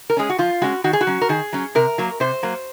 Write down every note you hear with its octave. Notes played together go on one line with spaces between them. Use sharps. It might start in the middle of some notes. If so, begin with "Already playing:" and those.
A#4
G#3 C#4 G#4
F#4
F3 F4
G#3 C#4 F#4
D#3 F#4
G#4
F#4
F#3 C#4
A#4
D#3 G#4
F#3 C#4
C3 A#4
F#3 A#3
C3 C5
F#3 A#3